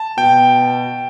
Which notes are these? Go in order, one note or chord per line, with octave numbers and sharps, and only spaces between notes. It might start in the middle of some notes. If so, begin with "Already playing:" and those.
Already playing: A5
B2 G5